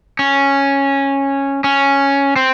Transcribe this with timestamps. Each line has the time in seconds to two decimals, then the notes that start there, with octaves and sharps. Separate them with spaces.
0.19 C#4
1.64 C#4
2.36 C4